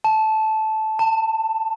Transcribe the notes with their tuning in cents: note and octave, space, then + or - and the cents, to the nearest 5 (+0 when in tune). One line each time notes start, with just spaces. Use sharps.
A5 -10
A5 +25